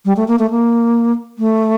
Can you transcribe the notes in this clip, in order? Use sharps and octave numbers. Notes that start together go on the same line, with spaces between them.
G3
A3
A#3
A3
A#3
A3